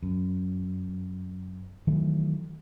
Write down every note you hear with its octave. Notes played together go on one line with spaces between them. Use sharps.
F#2
D#3 E3 F#3 A3